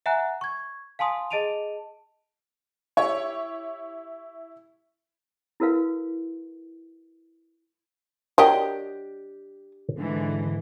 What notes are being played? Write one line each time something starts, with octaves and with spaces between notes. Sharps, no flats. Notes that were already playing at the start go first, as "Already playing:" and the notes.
E5 F#5 G#5 A#5 F#6
C#6 G#6
F5 G#5 A5 C6 D#6
G#4 D#5 A5 D7 D#7 F7
E4 G4 C#5 C#6
E4 F#4 A#4 B4 F5
F#3 D4 G4 A#4 D#5 G5
G#2 D3 E3